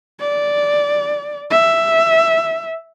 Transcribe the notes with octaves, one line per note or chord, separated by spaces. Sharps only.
D5
E5